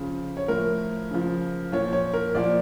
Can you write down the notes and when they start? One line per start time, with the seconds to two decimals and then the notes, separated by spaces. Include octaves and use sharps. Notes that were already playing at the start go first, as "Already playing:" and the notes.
Already playing: C#3 F3
0.37 C#5
0.48 A2 F3 A#4
1.11 C#3 F3
1.72 A#2 F3 C#5
1.93 C#5
2.13 A#4
2.35 A#2 F3 D5